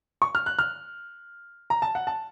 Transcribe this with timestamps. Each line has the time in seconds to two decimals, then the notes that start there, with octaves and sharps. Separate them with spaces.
0.22 C#6
0.35 F6
0.46 F#6
0.59 F6
1.70 A#5
1.82 A5
1.95 F#5
2.07 A5